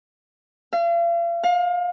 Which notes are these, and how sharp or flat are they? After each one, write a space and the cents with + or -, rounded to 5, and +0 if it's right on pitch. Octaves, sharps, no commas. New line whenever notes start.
F5 -40
F5 +30